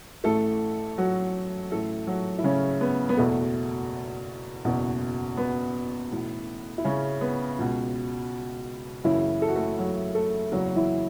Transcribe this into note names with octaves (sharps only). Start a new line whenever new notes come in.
A1 A2 E3 A3 A4
F#3 F#4
A1 A2 E3 A3 A4
F#3 F#4
E4
C#3 C#4
B3
B3
F#1 E2 B2 A3
F#1 E2 B2
B3
B1 A2 E3
E4
C#3 C#4
B3
C#2 B2
F#1 F#2 C#3 E3 E4
A4
F#4
A3 A4
F#3 F#4
A3 A4
F#1 E2 C#3 E3 F#3 F#4
E3 E4